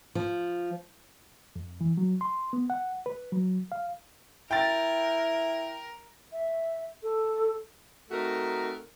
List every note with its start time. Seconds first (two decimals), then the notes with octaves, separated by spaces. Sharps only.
0.15 F3
1.56 F2
1.81 E3
1.97 F#3
2.21 C6
2.53 B3
2.70 F#5
3.06 B4
3.32 F#3
3.72 F5
4.51 E4 A#4 G5 A6
6.32 E5
7.03 A4
8.11 A3 C4 D#4 F#4 A#4